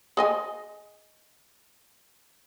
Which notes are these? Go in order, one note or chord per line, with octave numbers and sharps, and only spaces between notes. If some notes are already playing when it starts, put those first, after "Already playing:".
G#4 D#5 G#5